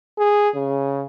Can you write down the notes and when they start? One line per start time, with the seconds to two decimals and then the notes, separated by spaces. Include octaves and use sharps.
0.18 G#4
0.55 C#3